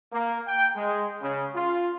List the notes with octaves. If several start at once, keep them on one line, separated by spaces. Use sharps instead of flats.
A#3
G5
G#3
C#3
F4